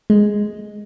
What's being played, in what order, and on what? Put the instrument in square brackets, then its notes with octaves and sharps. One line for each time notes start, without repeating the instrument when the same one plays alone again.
[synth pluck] G#3